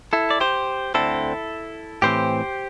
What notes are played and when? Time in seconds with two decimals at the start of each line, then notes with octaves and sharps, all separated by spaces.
0.13 E4 A4
0.31 D5
0.40 G4 C5
0.94 D2 D3 C4 E4 A4
2.02 A2 E3 C4 G4 C5